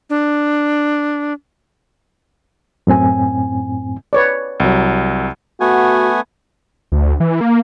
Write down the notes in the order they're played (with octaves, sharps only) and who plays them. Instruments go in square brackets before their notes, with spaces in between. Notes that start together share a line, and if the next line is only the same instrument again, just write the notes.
[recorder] D4
[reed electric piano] F#2 A2 C4 G#5
[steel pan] B4 C#5 D5
[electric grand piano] C2 F#3
[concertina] A3 B3 G#5 [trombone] F#4
[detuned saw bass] D2
E3
A#3